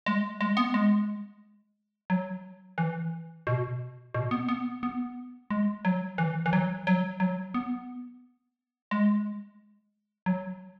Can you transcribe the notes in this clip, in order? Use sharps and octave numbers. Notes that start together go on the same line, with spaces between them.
G#3
G#3
B3
G#3
F#3
E3
B2
B2
B3
B3
B3
G#3
F#3
E3
E3
F#3
F#3
F#3
B3
G#3
F#3